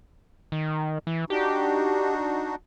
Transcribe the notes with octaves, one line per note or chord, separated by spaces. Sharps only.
D#3
E3
D4 D#4 F#4 G4